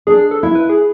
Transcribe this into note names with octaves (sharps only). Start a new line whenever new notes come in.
D4 G#4
A4
E4
B4
G#4